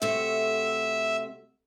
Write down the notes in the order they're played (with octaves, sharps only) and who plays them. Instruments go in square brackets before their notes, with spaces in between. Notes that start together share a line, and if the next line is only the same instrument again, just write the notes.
[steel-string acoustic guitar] C3 A3 F#4 [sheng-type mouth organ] E5